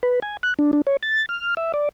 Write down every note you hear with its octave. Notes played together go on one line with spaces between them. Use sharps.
B4
G#5
F#6
D4
D4
C#5
A6
F6
E5
D5